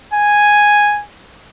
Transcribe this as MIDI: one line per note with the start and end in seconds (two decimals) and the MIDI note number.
0.13 1.03 80